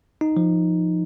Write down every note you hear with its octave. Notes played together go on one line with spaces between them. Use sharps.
D#4
F3